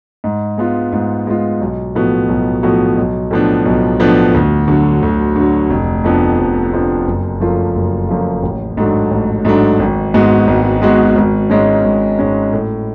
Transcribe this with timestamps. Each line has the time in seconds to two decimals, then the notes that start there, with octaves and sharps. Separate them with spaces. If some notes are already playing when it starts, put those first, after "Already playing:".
0.24 G#2
0.58 G#3 B3 F4
0.93 G#2
1.27 G#3 B3 F4
1.61 B1
1.95 A2 F3 B3 F#4
2.29 B1
2.63 A2 F3 B3 F#4
2.97 B1
3.31 A2 F3 B3 D4
3.65 B1
4.00 A2 F3 B3 D4
4.34 D2
4.68 D3 F#3
5.02 D2
5.36 D3 F#3
5.70 F1
6.04 F2 F3 B3 D4
6.39 F1
6.73 F2 F3 B3 D4
7.07 F#1
7.40 F#2 F3 A3 F4
7.75 F#1
8.08 F#2 F3 A3 F4
8.43 A1
8.77 G#2 F#3 A3 D4
9.11 A1
9.45 G#2 F#3 A3 D4
9.79 G#1
10.14 G#2 G#3 B3 F#4
10.47 G#1
10.82 G#2 G#3 B3 F#4
11.15 G#1
11.50 G#2 G#3 C#4
11.84 G#1
12.19 G#2 G#3 C#4
12.53 A2